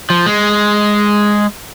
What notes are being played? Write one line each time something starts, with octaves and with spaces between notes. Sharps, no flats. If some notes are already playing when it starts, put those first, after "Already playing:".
F3
G#3